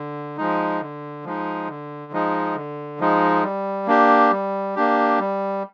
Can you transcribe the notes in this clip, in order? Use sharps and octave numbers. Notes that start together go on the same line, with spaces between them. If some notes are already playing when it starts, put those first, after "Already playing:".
Already playing: D3
F3 G#3 D#4
D3
F3 G#3 D#4
D3
F3 G#3 D#4
D3
F3 G#3 D#4
G3
A#3 D4 G4
G3
A#3 D4 G4
G3